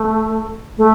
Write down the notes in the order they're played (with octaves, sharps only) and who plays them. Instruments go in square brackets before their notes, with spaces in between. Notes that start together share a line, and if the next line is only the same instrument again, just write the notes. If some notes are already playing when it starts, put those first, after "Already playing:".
Already playing: [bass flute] A3
A3